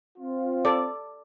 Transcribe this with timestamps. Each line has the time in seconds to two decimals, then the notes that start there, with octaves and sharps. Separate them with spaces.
0.18 C4 F4
0.65 A4 D5